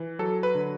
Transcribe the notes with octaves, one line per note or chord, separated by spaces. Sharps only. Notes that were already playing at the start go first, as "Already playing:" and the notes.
Already playing: E3
F#3 A4
B4
D3